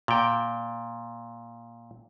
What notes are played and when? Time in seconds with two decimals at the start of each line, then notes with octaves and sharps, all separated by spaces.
0.08 A#2 G5